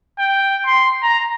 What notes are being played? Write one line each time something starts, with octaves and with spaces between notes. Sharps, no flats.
G5
C6
A#5